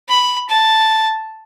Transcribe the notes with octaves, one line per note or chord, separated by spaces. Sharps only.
B5
A5